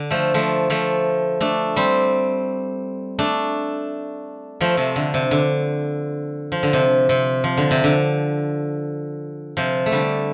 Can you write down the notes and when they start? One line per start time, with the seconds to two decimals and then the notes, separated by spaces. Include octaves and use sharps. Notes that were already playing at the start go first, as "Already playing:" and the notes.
Already playing: D3
0.11 F3 A3
0.34 F3 A3
0.70 F3 A3
1.41 A3 D4
1.76 G3 C4
3.19 A3 D4
4.61 F3 A3
4.77 C3 F3
4.96 D3
5.14 C3
5.31 D3
6.52 F3
6.63 D3
6.73 C3
7.09 C3
7.44 F3
7.57 D3
7.71 C3
7.84 D3
9.57 C3 F3
9.86 A3
9.92 D3 G3